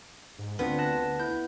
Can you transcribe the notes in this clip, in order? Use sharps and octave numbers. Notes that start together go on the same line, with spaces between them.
G#2
D2 B3 C4 D4 F4
A5 F#6 A#6
E4 G6